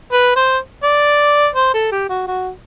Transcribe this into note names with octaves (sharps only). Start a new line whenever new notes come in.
B4
C5
D5
C5
A4
G4
F#4
F#4